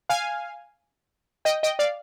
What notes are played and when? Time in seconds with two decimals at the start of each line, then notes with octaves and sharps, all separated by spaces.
0.09 F5 G#5
1.45 D#5 G5
1.63 D#5 G5
1.79 D5 F5